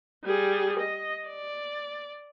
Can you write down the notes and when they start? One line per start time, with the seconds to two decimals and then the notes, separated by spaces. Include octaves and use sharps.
0.24 G3 G#4
0.79 D#5
1.28 D5